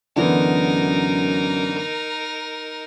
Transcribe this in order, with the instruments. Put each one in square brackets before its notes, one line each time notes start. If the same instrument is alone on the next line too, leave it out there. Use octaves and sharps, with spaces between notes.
[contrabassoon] F#2 [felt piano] D3 E3 B3 [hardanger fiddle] D#4 A#4